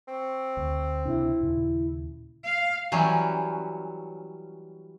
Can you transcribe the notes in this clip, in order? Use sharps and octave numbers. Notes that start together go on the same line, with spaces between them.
C4 C#6
D2
C#2 C3 D4 E4
D#2 A#2 C#3
F5
E3 F#3 G3 C#4